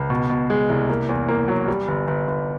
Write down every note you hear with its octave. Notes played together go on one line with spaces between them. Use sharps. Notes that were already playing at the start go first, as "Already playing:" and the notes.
Already playing: C#2
B2
B2
G#3
C2
A#3
E2
A#3
F#3
G3
G1
G1
G1